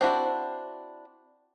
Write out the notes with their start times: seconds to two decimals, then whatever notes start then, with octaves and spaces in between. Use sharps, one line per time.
0.01 C4 D4 E4 F#4